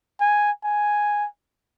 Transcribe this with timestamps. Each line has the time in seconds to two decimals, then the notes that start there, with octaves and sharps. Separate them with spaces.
0.20 G#5
0.64 G#5